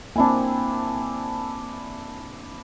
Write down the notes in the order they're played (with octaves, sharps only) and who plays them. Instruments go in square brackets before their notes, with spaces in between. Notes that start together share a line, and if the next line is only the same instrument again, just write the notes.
[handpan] A#3 C4 [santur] D4 E4 G#5